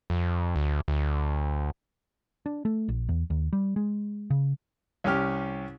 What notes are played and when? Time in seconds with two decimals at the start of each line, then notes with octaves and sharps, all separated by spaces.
0.10 F2
0.56 D2
0.88 D2
2.46 D4
2.65 A3
2.89 A#1
3.09 E2
3.30 D#2
3.53 G3
3.76 G#3
4.30 C#3
5.04 C2 C#4 G4 F6